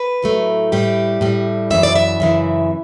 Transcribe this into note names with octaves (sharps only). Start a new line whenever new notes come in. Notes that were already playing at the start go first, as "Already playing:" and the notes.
Already playing: B4
A2 F#3 A3
A2 G3 G4
A2 G3
F#2 C#3 E3 E5
D5
E5
F#2 C#3 E3